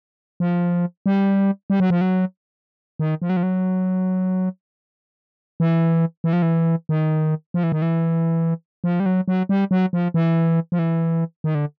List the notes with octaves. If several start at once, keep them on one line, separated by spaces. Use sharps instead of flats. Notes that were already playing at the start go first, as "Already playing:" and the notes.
F3
G3
G3
F#3
F3
F#3
D#3
F3
F#3
F3
F#3
E3
E3
F3
E3
D#3
F3
E3
D#3
E3
F3
G3
F#3
F#3
G3
F#3
F3
E3
F3
E3
D#3
D3